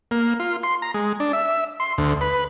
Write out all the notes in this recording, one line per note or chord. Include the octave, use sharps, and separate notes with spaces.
A#3
F4
C6
A#5
G#3
D4
E5
C6
D2
B4